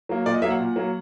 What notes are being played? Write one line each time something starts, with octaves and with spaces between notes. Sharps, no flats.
F#3 A#3
A#2 D5
D#5
F#3 A#3 E5
F#5
A#2
F#3 A#3